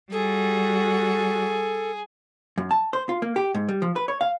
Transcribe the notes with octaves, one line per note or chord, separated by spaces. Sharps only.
G3 F#4 G#4 A4
F#2
A5
C5
F4
A#3
G4
G#2
G3
F3
B4
C#5
F5